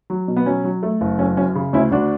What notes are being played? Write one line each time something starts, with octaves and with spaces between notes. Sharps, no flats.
F#3
B2
B3
F#3 C#4
F#3
A3
F#1
F#2 C#4
F#2 C#4
C#3
D2 C#4 E4
D2 D4 F#4